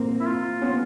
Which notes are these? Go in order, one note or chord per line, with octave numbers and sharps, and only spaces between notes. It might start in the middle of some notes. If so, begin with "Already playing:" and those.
Already playing: A#3 C4
E4
F4
B3 C#4